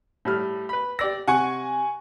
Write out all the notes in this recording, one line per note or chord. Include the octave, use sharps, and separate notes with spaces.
A2 G3 F6
B4 B5
G4 D5 E6 A#6
C3 F#5 G#5 C#6